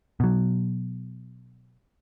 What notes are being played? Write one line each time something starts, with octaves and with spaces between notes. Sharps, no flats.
B2 F#3